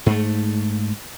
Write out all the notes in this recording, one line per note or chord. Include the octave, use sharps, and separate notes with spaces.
G#2 A3